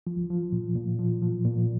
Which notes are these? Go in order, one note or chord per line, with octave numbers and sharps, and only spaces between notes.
F3
F3
A#2
A#2
F3
F3
A#2